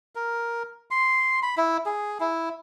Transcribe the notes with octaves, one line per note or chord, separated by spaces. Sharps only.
A#4
C6
B5
E4
G#4
E4